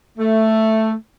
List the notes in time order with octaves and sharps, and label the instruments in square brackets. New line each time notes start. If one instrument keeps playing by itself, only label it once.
[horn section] A3